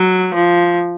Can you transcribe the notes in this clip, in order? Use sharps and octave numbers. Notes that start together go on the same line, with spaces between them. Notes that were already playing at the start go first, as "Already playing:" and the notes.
Already playing: F#3
F3